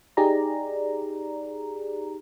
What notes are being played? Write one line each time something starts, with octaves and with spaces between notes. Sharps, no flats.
D#4 G4 G#4 D5 A#5